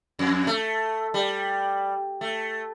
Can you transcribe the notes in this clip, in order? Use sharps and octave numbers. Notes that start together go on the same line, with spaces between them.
F2
A3
G3
A3